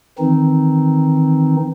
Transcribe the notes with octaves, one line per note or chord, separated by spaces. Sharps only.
D#3 E3 C4 D#4